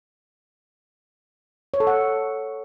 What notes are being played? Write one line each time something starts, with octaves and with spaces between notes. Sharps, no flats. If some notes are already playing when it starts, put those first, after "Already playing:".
C#5
A4
F#5